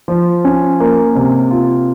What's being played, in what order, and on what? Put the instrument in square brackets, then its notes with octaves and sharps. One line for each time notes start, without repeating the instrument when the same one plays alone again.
[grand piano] F3
C#4
A#3
C3
F4